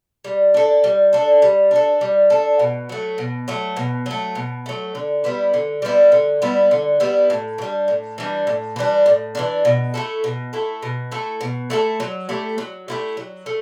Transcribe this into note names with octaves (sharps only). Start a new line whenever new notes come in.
G3
D4 A4
G3
D4 A4
G3
D4 A4
G3
D4 A4
B2
F#3 A3
B2
F#3 A3
B2
F#3 A3
B2
F#3 A3
D3
G3 B3 E4
D3
G3 B3 E4
D3
G3 B3 E4
D3
G3 B3 E4
A2
E3
G3 D4
A2
E3 G3 D4
A2
E3 G3 D4
A2
E3 G3 D4
B2
A3 E4 A4
B2
A3 E4 A4
B2
A3 E4 A4
B2
A3 E4 A4
F#3
A3 E4 G4
F#3
A3 E4 G4
F#3
A3